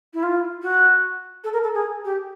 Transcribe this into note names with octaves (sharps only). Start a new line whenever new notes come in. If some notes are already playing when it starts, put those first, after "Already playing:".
E4
F4
F#4
A4
A#4
A4
G#4
G4